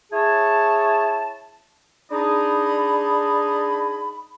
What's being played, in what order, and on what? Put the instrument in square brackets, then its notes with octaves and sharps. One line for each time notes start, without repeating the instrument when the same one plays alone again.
[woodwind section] E4 G#4 C#5 A5
D4 D#4 G#4 D#5 A5 B5